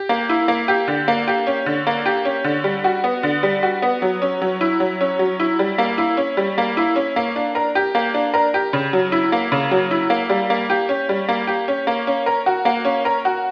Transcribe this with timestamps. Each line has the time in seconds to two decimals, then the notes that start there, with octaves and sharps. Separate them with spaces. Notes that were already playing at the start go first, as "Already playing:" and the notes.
Already playing: G4
0.09 A#3
0.29 E4
0.48 A#3
0.68 G4
0.88 D3
1.08 A#3
1.28 G4
1.47 C#4
1.66 D3
1.87 A#3
2.06 G4
2.25 C#4
2.44 D3
2.64 G3
2.84 F#4
3.04 B3
3.23 D3
3.43 G3
3.63 F#4
3.82 B3
4.02 F#3
4.22 C#4
4.42 F#3
4.61 E4
4.80 F#3
5.01 C#4
5.19 F#3
5.40 E4
5.59 G3
5.78 A#3
5.98 E4
6.17 C#4
6.37 G3
6.58 A#3
6.77 E4
6.96 C#4
7.16 A#3
7.36 D4
7.55 A#4
7.75 G4
7.95 A#3
8.14 D4
8.34 A#4
8.54 G4
8.73 C#3
8.93 F#3
9.12 E4
9.32 A#3
9.52 C#3
9.71 F#3
9.91 E4
10.10 A#3
10.30 G3
10.50 A#3
10.70 G4
10.89 C#4
11.09 G3
11.29 A#3
11.47 G4
11.68 C#4
11.87 A#3
12.07 C#4
12.26 A#4
12.46 F#4
12.65 A#3
12.85 C#4
13.05 A#4
13.25 F#4